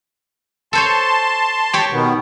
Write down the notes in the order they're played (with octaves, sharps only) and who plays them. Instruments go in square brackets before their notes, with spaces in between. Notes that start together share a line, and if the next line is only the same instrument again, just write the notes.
[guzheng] A4 C5 C#5 [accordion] A5 C6
[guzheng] G4 C#5
[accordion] B2 D#3 B3